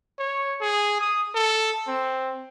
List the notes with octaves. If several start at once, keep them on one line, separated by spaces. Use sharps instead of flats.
C#5
G#4
D#6
A4
C4